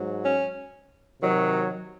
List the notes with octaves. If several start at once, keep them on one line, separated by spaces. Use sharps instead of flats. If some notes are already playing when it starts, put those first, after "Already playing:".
Already playing: G#2 F#3
C#4
C3 D#3 F#3